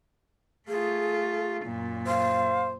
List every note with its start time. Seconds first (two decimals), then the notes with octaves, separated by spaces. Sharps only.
0.68 A3 F4 G#4
1.64 F#2 A#2
2.07 C5 F5